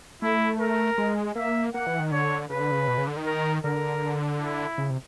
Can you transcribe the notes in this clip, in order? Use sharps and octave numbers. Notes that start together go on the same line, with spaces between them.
A3 E4
A#4
G#3
A#3 E5
A#3 F#5
E3
D#3
D3 C#5
C#3 B4
D3
C#3
B2
C#3
D3
D#3
A#4
D3 A#4
E4
C#3
C3